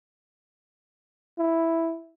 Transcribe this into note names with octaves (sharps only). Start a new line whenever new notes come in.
E4